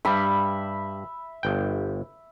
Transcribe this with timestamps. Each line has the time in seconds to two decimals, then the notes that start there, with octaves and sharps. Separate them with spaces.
0.05 G2 G3 E5 B5
1.43 G1 G5